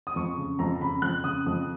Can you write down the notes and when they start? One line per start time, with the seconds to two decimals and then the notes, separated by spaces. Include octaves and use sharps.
0.07 D#6
0.16 F2 C#6
0.38 C#3
0.59 F2 A#5
0.81 C#3 B5
1.02 F2 F#6
1.24 C#3 D#6
1.46 F2 D#6